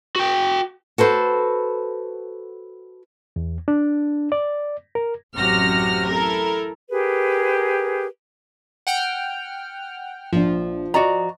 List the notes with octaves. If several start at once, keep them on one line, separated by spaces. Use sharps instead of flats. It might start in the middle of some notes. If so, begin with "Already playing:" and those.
F#4 G5
F#4 A4 B4 C5
E2
D4
D5
A#4
A1 F#2 C3 F#4 F6 A#6
E4 A4 A#4
G4 G#4 A#4 B4
F#5 G5 F6
A#1 F3 D4
F#4 D5 D#5 A#5